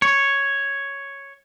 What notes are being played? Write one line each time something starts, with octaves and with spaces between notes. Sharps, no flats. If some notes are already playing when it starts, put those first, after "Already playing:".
C#5